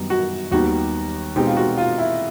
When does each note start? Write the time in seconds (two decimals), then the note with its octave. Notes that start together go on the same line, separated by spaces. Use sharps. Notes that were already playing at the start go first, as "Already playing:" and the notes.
Already playing: F#2 D#3 G3 B3 D#4
0.10 F#4
0.52 D#2 D#3 G3 B3 D#4 F#4
1.36 B2 G#3 C4 D#4 G4
1.47 F4
1.57 F#4
1.77 F4
1.98 E4